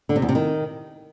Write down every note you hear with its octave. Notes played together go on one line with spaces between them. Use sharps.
D3
C3
E2
C3
D#3